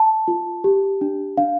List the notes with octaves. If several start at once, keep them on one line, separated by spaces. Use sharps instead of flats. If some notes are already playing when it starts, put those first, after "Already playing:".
Already playing: A5
F4
G4
D4
D4 F5